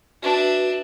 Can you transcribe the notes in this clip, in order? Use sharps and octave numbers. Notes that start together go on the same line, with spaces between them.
D4 F#4 B4 E5